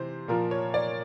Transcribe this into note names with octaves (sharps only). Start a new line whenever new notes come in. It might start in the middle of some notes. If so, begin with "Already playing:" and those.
Already playing: C3 E3 C5
A#2 F3 A#4
C#5
D5